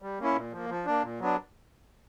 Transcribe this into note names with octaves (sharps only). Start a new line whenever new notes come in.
G3
A#3 C#4 E4
A#2
F3 A#3
F3
A#3 D4
A#2
F#3 B3 D4